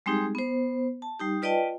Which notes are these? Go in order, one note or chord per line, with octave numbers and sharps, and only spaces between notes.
G3 G#3 C4 D#4 G4 G#4
B3 C5
A5
G3 D#4 G4
F4 B4 D5 D#5 G5 A5